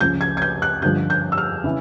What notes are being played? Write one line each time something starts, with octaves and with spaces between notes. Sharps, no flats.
C#2 C#3 F3 G6
G#6
G#6
G6
F#6
G2 D3 F3 G6
G6
E6
F6
C#3 E3